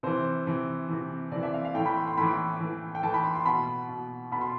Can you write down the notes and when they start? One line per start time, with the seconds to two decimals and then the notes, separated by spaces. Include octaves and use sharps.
0.03 C3 E3 C5
0.47 C3 E3
0.89 C3 E3
1.32 C3 E3 D5
1.43 E5
1.54 F5
1.65 F5
1.75 A2 E3 G5
1.86 B5
1.96 C6
2.08 C6
2.17 A2 E3 B5
2.60 A2 E3
2.95 G5
3.03 A2 E3 A5
3.14 B5
3.24 C6
3.35 C6
3.45 B2 B5
3.89 B2
4.32 B2 B5
4.41 C6